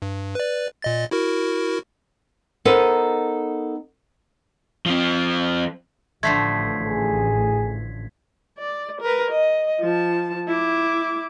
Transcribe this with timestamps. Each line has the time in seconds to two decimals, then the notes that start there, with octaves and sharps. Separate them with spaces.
0.02 G2
0.35 B4 D5
0.82 A#2 D#5 A6
1.11 E4 F#4 A#4
2.65 B3 D#4 A4 A#4 C5
4.86 F3 C4
6.23 A1 D3 F3 A3 G#6 B6 C7
6.87 G#4
8.58 D5
9.01 A#4 B4
9.31 D#5
9.80 F3 A5
10.47 E4 D6